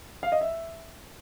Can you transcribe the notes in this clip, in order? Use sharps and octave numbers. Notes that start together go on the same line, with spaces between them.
F5
D#5
E5